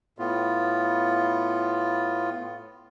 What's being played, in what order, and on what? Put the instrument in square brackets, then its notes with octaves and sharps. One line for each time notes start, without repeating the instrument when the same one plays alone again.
[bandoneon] A2 B3 F4